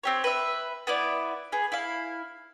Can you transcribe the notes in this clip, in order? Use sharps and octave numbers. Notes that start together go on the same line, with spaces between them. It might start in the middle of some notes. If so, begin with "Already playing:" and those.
C4 G4 C#5
B4 E5
B3 E4 D5
B3 G#4
E4 F5